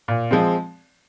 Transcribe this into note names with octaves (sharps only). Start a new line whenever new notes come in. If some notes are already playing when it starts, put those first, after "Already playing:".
A#2
F3 G#3 C4